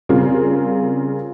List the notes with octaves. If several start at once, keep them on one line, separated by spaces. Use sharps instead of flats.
C#3 G3 C4 F4 A#4